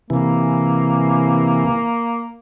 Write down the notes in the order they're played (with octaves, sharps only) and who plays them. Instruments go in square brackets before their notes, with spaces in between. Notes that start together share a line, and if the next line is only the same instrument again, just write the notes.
[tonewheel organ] C3 E3 [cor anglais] A#3